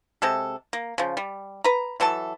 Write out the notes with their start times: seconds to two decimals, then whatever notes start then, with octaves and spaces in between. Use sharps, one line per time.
0.22 C3 G#3 A4
0.73 A#3
0.98 C#3 F3
1.17 G3
1.64 B4 A#5
2.00 E3 F#3 A4 A5